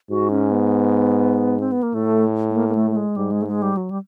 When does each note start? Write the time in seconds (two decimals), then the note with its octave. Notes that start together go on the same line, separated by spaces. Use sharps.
0.10 G#2 F#4
0.31 C#4
0.51 B3
1.60 C4
1.72 B3
1.83 A#3
1.94 A2 A3
2.50 A3
2.56 A#3
2.69 A#3
2.75 A3
2.91 A3
2.96 G#3
3.16 G#2 G3
3.32 G#3
3.42 A3
3.47 G#3
3.62 G3
3.77 F#3
3.90 G3